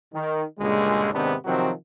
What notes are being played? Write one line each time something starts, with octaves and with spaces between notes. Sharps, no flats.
D#3
C#2 G2 A#2 D3 G#3
G#2 C3 D#3 B3 C4 D4
C3 D#3 F3 F#3 C4 F#4